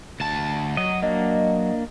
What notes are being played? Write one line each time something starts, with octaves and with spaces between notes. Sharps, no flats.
D2 A5
F#3 D#5
A#3 D4 D#5